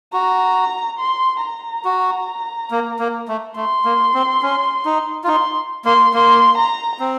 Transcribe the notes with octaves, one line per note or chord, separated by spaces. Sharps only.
F#4 A#5
C6
A#5
F#4
A#3
A#3
A3
A3 C6
A#3
C4
C#4
D#4
F4
D#4 C6
A#3 C6
A#3 C6
A#5
C4